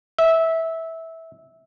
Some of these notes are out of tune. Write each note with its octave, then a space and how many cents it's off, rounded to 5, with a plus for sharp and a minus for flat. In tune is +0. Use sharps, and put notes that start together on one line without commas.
E5 -15